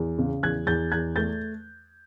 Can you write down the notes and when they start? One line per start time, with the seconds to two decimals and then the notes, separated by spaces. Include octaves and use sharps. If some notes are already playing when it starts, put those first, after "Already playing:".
Already playing: E2
0.18 C#3
0.43 E2 F#6 G#6
0.67 E2 G6 A6
0.92 E2 F#6 G#6
1.16 A3 G6 A6